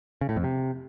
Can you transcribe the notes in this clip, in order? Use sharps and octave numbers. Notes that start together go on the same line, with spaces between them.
C#3
A2
F2
C3